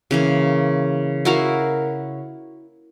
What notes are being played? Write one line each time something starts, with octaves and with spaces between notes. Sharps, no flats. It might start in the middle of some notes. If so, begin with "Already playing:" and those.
C#3 E3 A#3
E4 F#4 A#4 F5